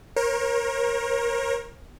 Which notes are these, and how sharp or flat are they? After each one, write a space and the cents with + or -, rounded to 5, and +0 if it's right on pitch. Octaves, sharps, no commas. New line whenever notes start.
A#4 +20 C#5 -40